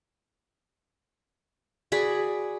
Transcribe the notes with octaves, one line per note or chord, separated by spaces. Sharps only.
F#4 G#4 D5 B5